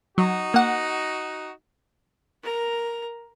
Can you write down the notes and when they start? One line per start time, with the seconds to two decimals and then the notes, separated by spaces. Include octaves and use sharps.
0.18 F#3 D#4 F#4
0.54 A#3 F#5
2.43 A#4 A#5